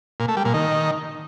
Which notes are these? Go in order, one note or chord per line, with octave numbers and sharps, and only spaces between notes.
A#2
A3
G3
A#2
D#3